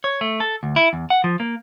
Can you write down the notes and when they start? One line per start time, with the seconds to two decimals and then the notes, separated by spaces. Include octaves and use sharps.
0.04 C#5
0.21 A3
0.40 A4
0.63 D2
0.76 E4
0.93 E2
1.10 F#5
1.24 F3
1.40 A#3